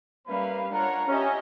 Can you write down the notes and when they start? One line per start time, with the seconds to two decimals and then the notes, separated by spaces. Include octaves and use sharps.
0.28 G3 A#3 C#4 B4 E5 F5 B5
0.72 D4 F4 A#4 C#5 F#5 A#5
1.08 C#4 G4 D#5 E5